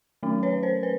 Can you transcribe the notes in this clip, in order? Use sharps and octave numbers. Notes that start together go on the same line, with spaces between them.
D#3 F#3 A3 C#4
B4 C#5
A#4 C5
B4